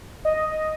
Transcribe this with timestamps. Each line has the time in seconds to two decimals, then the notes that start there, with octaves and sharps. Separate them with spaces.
0.25 D#5